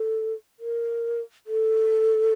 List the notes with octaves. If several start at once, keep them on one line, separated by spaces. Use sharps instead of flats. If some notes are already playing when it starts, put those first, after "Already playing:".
Already playing: A4
A#4
A4